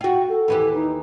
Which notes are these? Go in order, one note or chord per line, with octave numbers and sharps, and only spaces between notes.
F4 F#4 G5
A4
D#2 E3 G4
D#4